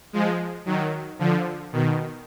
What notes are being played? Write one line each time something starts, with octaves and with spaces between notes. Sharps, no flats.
F3 G#3
D#3 F#3
D3 F3
B2 D#3